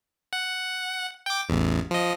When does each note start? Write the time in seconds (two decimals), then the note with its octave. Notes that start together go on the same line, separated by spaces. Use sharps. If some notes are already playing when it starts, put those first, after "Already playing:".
0.33 F#5
1.26 G5 D6
1.49 A1 E2
1.91 F3 D#5